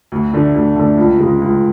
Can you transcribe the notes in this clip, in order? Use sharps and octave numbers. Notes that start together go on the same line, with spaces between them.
D2
D3 A3
D2
D3 A3
C#2
C#3 G#3
C#2